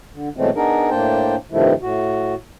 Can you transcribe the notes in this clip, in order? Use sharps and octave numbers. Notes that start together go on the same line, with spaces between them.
D3
B2 E3 F#3 G#3 A3 C4
B3 D4 D#4 G#4 A#4
A2 A#3 D4 C5 G5 A5
G2 C3 D#3 F3 A3 E4
A2 F#4